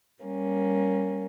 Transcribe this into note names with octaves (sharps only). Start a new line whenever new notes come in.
G3 A#3 C#4